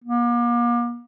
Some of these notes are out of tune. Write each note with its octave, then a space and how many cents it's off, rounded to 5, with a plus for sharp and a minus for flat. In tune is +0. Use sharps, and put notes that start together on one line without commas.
A#3 +40